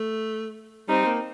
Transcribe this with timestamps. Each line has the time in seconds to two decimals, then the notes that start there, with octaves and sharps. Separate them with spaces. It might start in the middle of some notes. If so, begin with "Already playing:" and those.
Already playing: A3
0.88 G3 C4 D#4
1.06 A#3